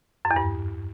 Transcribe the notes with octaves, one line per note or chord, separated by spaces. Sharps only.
F#2
E2
G2